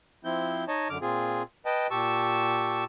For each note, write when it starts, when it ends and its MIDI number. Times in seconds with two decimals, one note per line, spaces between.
0.25 0.65 53
0.25 0.65 60
0.25 0.65 64
0.25 0.65 91
0.68 0.88 63
0.68 0.88 73
0.68 0.88 75
0.68 0.88 81
0.90 0.98 42
0.90 0.98 50
0.90 0.98 86
0.90 0.98 89
1.01 1.42 46
1.01 1.42 60
1.01 1.42 65
1.01 1.42 68
1.66 1.87 71
1.66 1.87 75
1.66 1.87 79
1.66 1.87 81
1.91 2.84 46
1.91 2.84 67
1.91 2.84 81
1.91 2.84 85
1.91 2.84 88